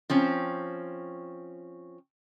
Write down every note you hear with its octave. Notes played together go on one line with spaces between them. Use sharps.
F3 C4 C#4